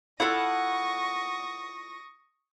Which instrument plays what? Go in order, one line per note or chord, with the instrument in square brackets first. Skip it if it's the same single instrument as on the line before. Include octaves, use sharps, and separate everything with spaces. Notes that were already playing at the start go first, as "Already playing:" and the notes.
[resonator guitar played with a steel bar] E4 F4 A4 [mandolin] F#5 [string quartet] C#6 D#6 A#6